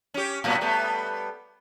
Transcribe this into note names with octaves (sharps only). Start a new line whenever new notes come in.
C#4 G4
A2 G3 B3
G3 A3 B3